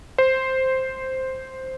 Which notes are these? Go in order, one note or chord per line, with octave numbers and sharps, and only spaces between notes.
C5